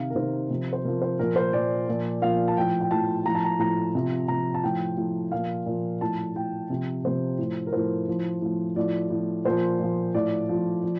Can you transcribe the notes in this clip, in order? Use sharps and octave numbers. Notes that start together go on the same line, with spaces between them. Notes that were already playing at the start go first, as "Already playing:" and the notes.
Already playing: C3 D#3 F5
A#4
C3 D#3 C5
C3 F3
C5
C3 F3 A#4
C5
A#2 F3 A#4
C5
A#2 F3 D5
A#2 F3
A#2 F3 F5
A5
A2 F3 G5
G5
A2 F3 A5
A2 F3 A#5
A5
A#5
A2 F3 A#5
C3 F3
C3 F3 A#5
A5
A2 F3 G5
A2 F3
A#2 F3 F5
A#2 F3
A2 F3 A5
A2 F3 G5
C3 F3
C3 F3 C5
A2 F3
A#4
A2 F3 C5
A2 F3
A2 F3
A2 F3 D5
A2 F3
A#2 F3 C5
A#2 F3
A2 F3 D5
A2 F3
F3